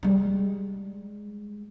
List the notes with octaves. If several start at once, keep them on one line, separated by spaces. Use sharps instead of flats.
G3 G#3